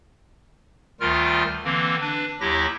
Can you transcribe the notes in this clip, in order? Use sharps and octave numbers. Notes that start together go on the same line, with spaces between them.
D2 D#3 G3 F4 A#4 F6
D3 E3 A#3 C4
D4 B4
D#2 F#3 E4 G4 A#6